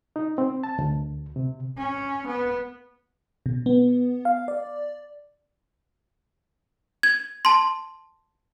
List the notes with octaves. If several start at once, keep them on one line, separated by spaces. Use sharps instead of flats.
D#4
C4
A5
D2
C3
C#4
B3
B2
B3
F5
D5
G#6
A5 C6